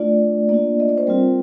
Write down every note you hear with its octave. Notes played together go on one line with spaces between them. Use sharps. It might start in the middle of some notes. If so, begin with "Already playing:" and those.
Already playing: A3 D4 F4 D5
A#3 D4 F4 D5
D#5
D5
C5
G3 C4 F4 A#4